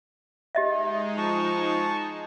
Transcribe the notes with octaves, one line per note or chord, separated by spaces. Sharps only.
G#3 D#4 G4 D#5 E5
F3 A5 C#6